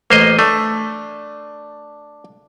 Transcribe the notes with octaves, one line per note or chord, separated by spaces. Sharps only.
A1 A#3 C5 D#5
A3 D4